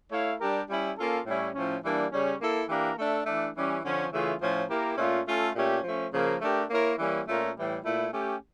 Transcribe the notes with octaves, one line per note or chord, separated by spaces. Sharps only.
A3 E4 A4 C#5 F5
G3 D4 G4 A#4
G3 C#4 E4
A#3 C#4 F4 A4
A2 G3 C#4 E4
A2 F3 C#4
E3 G3 A#3 D4
C#3 G3 C#4
A#3 E4 A4
E3 A#3 D4 G4 A#4
A3 D4 A4 E5
E3 A3 D4
E3 G3 C#4 G4
D3 F3 C#4
C#3 E3 A3 C#4 F4
A2 F3 C#4 F4
A#3 E4 G4 A#4
A#2 A3 C#4 F4
A3 C#4 F4 A4
A#2 A3 C#4 G4
F3 A3 C#4
C#3 F3 A#3
A3 D4 G4 A#4
A#3 E4 A#4 C#5
E3 G3 A#3 C#4
A#2 A3 C#4 F4 A#4
A2 E3 G3
A#2 A3 E4
A3 C#4 G4